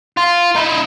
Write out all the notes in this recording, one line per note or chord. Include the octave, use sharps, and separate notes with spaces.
F4
D#4 E4